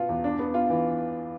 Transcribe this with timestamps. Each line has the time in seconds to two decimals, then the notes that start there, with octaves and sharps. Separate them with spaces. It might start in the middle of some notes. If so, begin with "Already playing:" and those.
Already playing: B2 B3 F4
0.09 E2
0.24 D4
0.39 B3
0.54 F4
0.70 E3